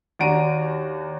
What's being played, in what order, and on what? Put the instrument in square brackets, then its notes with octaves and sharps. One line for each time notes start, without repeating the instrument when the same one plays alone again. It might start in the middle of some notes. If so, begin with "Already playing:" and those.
[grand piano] D#2 D4 F#4 A#5 D7 D#7